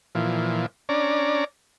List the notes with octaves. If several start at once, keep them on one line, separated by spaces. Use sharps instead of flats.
A#2 E3 F3
C#4 D4 D5 A#5